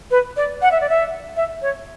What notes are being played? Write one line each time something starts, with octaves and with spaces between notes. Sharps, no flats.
B4
D5
F#5
E5
D5
E5
E5
C#5